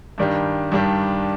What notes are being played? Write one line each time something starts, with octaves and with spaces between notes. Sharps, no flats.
G2 D#3 G3 D4 G4
G2 D#3 G3 D4 G4